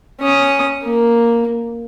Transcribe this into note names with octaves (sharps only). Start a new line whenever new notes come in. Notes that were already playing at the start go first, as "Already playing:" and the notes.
C#4 D#6
A#3